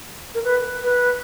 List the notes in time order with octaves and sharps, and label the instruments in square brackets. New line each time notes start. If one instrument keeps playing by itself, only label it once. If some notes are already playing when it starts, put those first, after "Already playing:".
[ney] A#4
B4
B4